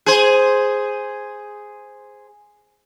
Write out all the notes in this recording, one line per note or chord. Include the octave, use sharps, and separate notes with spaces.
G#4 C5